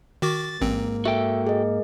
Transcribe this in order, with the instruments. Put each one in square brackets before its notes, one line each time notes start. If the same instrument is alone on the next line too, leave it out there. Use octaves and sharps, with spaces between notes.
[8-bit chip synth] D#3 F#4 D6 [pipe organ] A6
[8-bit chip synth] A1 C4 [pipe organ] G#2 A#3
[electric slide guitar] F#4 A4 G5 [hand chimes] E5
[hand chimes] G#4 D#5